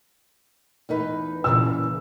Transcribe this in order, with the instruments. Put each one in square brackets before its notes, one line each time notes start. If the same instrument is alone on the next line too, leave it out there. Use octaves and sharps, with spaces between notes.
[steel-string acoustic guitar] E2 D#4 B4
[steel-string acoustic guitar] A#2 C#3 E3 [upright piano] E6